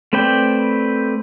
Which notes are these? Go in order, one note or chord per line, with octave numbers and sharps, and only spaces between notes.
A3 C4 B4 D5 G5